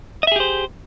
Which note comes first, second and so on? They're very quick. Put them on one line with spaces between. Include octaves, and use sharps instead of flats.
D#5 E5 G#4 G4 C5